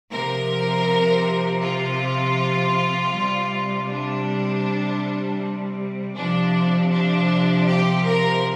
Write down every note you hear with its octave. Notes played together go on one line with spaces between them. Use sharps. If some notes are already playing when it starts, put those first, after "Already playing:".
C3 F3 A#4
F4
C3 G3
D4
C3 F3 D4
D4
G4
A#4